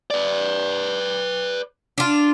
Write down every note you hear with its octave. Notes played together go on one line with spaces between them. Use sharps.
B4 D5
D4 F4